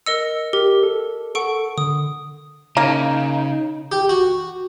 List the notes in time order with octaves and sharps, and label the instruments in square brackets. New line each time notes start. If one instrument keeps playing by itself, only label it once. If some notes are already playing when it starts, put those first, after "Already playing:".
[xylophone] A#4 D#5 E6 [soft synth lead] C#7
[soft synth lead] G4 [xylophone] A#4
[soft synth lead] A4
[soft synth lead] A4 [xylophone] F#5 C#6 D7
[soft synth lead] D3 [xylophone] D#6
[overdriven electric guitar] C#3 [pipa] A#3 [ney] D#4
[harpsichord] G4
F#4